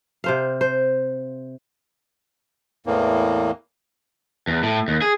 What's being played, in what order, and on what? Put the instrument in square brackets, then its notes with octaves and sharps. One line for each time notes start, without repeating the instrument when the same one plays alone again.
[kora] C3 C5 F5
C5
[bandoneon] E2 A2 E3 A#3
[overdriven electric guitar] E2
A2
D#2
G#4